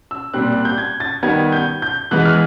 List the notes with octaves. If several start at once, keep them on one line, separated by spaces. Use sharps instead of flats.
E6
A#2 G3 C4 F#6
F#6
G6
G#6
A6
D#3 G3 B3 G#6
G6
G6
E3 G#3 B3 F#6
F6